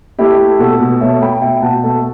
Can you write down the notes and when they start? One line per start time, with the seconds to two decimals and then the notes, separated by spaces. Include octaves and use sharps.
0.19 A3 E4 G4
0.39 A3
0.59 B2 F#4 A4
0.80 B2
1.01 A3 C#5 E5
1.22 A3 G5 B5
1.42 B2 E5 G5
1.62 B2 F#5 A5
1.84 A3